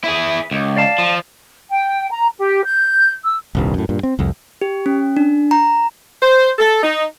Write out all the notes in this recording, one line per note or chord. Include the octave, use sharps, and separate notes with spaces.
E4 G#4
C#2
D5 F5 A5
F3
G5
A#5
G4
G6
E6
D#1 C2 G2
F#2 A2
G2 A#2
C4
C2 F2
G4
C#4
D4
A#5
C5
A4
D#4